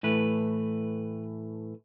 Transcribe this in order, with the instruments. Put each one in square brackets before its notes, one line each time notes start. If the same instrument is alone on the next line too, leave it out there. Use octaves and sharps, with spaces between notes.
[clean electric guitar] A2 E3 A3 B4